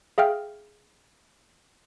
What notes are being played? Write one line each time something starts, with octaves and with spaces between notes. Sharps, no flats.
G#4 E5 F5 G5 F6